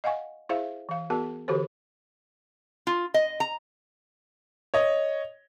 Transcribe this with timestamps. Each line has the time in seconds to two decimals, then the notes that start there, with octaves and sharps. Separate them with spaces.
0.04 D#5 F5 F#5 G#5 C#6
0.49 E4 G#4 C5 E5 F5
0.89 E3 F5
1.10 B3 F#4 G#4 A#4 A5
1.48 D3 E3 F#4 G4 A4 C5
2.87 F4
3.14 D#5
3.40 A#5
4.74 C#5 D#5